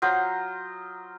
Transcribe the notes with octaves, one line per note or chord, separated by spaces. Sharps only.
F#3 F4 C5 D#6